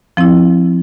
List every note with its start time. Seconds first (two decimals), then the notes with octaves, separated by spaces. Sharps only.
0.17 F3 C4 E4